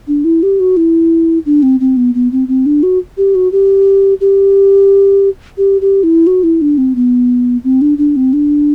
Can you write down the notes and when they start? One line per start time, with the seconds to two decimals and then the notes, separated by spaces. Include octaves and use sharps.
0.08 D4
0.24 E4
0.43 G4
0.60 F#4
0.77 E4
1.46 D4
1.63 C4
1.80 C4
1.97 B3
2.15 B3
2.32 C4
2.48 C4
2.66 D4
2.83 F#4
3.17 G4
3.35 F#4
3.52 G4
4.21 G4
5.58 G4
5.81 G4
6.03 E4
6.27 F#4
6.43 E4
6.62 D4
6.78 C4
6.95 B3
7.64 C4
7.81 D4
7.98 D4
8.16 C4
8.33 D4